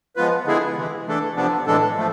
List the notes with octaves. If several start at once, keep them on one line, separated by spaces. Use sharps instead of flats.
F3 G#3 B3 F4 B4
D3 G#3 B3 E4 G#4
C3 E3 G#3
E3 A3 D4 A4
C3 F3 B3 D4
A2 E3 G#3 D4 A4
F3 A3